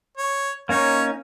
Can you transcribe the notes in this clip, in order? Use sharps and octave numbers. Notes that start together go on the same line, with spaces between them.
C#5
A#3 C#4 D#4 C#5